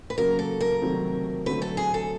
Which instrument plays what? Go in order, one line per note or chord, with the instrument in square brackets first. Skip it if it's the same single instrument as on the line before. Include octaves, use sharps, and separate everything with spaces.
[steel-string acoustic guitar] B4
[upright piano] C#3 F#3 A#3 [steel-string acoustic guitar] A#4
[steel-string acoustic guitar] A4
A#4
[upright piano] C3 D#3 F#3 A3 C4
[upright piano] D3 F#3 A3 C4 [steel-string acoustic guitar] B4
[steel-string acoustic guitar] A4
G#4
A4